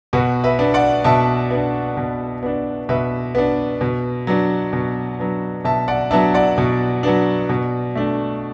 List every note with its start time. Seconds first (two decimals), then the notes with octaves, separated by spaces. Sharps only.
0.13 B2 F#4 B4
0.44 B4 E5
0.59 B3 D4
0.74 D5 F#5
1.04 B2 E5 A5
1.51 B3 D4
1.97 B2
2.43 B3 D4
2.89 B2 B4 E5
3.35 B3 D4
3.81 B2
4.27 F#3 B3 D4
4.73 B2
5.19 F#3 B3 D4
5.64 B2 E5 A5
5.88 D5 F#5
6.11 F#3 B3 D4 E5 A5
6.34 D5 F#5
6.58 B2
7.03 F#3 B3 D4
7.49 B2
7.95 A3 D4